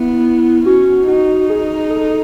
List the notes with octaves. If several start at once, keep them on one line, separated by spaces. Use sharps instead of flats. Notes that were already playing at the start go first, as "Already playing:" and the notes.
Already playing: B3 E4
C#4 F#4
D#4 F#4
G#4
A4